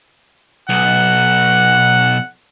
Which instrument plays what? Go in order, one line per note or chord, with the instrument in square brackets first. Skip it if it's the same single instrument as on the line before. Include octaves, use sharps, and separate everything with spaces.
[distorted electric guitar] B1 [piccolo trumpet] F#5